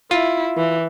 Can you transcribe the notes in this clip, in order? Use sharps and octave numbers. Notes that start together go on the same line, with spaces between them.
E4 F4
E3